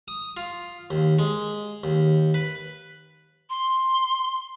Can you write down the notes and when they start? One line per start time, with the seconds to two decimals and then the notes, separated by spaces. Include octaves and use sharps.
0.08 D#6
0.37 F4
0.90 D#2
1.19 G#3
1.84 D#2
2.34 B4
3.50 C6